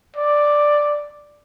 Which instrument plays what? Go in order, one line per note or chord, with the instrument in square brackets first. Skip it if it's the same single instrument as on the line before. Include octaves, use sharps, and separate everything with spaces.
[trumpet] D5